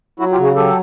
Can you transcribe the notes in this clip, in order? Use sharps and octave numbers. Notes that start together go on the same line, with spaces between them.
F#3 E4 F#4
F4 G4
C#3
F#4 G#4
F#3 G4 A4